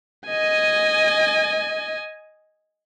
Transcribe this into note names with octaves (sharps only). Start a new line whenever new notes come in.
D#5 G#5